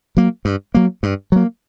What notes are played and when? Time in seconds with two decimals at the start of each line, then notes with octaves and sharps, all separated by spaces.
0.17 F#3 A#3
0.45 G2
0.75 F#3 A#3
1.03 G2
1.32 F#3 A#3